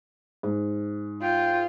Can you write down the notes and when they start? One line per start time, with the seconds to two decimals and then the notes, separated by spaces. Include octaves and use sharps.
0.43 G#2
1.22 F4 G5